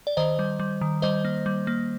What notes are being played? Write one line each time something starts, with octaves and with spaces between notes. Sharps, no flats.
D5
D#3 C5 D#5
G3
G3
D#3
G3 C5 D#5
A#3
G3
A#3